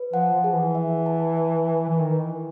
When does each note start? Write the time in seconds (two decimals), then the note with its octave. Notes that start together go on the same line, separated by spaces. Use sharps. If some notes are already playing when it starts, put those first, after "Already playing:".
Already playing: B4
0.13 F3 F#5
0.34 F3
0.44 G#4
0.54 E3
0.75 E5
1.06 A5
1.37 E5
1.68 B4
1.89 E3
1.99 D#3 B4
2.21 E3
2.30 E4